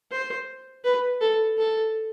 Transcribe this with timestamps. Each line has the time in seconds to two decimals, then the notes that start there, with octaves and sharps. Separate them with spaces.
0.11 C5
0.84 B4
1.21 A4
1.57 A4